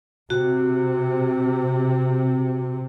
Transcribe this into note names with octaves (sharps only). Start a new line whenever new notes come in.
C3 F#4